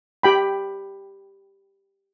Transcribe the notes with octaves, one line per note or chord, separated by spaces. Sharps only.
G4 G5 B5